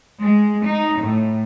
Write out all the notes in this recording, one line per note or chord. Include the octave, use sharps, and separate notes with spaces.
G#3
D#4
A2